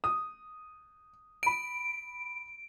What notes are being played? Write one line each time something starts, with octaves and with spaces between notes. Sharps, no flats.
D#6
B5 D7 D#7